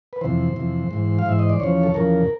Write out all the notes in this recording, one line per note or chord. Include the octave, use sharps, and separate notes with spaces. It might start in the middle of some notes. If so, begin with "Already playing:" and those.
B4
F2 C3 E3 C5
F2 C3 E3
G#2 E3
F5
G#2 E3 E5
D#5
D5
E2 C#3 F3 C#5
A4
E2 C#3 F3 A#4